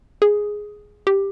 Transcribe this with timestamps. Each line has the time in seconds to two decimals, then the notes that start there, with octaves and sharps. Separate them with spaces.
0.22 G#4
1.07 G4